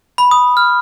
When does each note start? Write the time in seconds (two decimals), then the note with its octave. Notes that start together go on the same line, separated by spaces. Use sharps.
0.18 B5
0.31 D#6
0.57 F6